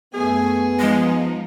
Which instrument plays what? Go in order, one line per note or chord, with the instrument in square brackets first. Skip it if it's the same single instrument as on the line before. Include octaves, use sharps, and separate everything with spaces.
[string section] F#2 A3 G#5 [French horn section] B3 [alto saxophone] G#4
[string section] F3 D#4 [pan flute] G#3